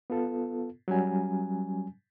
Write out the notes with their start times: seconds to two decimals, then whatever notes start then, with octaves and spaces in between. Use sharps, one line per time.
0.10 B3 F4 A4
0.88 F#3 G3 C#4 G#5